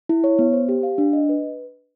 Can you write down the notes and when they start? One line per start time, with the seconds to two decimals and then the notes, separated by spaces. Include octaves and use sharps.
0.09 E4
0.24 C#5
0.39 B3
0.53 C5
0.69 G4
0.83 F5
0.98 D4
1.13 D#5
1.29 B4